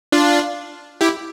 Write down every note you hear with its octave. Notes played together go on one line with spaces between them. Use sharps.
D4 F4
E4 G4